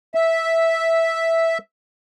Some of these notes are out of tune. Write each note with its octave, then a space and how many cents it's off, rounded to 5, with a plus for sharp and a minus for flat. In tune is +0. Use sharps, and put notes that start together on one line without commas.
E5 -5